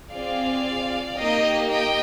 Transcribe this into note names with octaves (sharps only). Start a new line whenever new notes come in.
C4 F4 G#4 D5 F5
A#3 D#4 G4 D#5 G5
D#5 G5